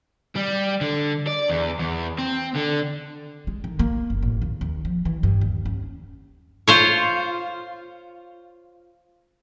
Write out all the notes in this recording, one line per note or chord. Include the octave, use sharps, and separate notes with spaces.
G3
D3
D5
E2
E2
C4
D3
G#3
D#3
A#3
F#1
A1
D#2
D#2
F3
E3
G2
D#2
C#4
F4 C5 C#5